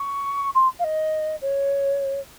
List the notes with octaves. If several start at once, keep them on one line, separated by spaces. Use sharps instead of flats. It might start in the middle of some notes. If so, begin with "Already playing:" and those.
Already playing: C#6
C6
F5
D#5
C#5